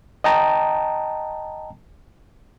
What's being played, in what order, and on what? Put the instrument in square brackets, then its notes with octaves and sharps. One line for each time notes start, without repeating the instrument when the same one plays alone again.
[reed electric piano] D#5 G5 A5 A#5